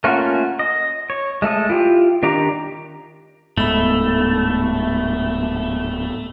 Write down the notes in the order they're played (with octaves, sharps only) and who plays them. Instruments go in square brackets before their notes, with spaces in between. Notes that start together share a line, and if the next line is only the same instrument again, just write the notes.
[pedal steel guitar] A3 A#3 C#4 F4 F#4
D#5
C#5
G#3 A3 A4 D#6
E4 F4 G4
D#3 D4 G4 A#5 D6
[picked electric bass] D1 G1 G#2 [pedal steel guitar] A3 [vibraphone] B3 B5